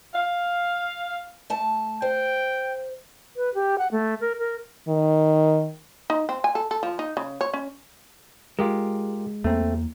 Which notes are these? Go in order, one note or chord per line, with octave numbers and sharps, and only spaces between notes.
F5
A3 A5
C5 G5
B4
G4
F#5
A3
A#4
A#4
D#3
D#4
C4
G#5
A4
A4
F3
D#4
C#3
C#5
C#4
G#3 F4 G4 A#4
E2 A3 A#3 C4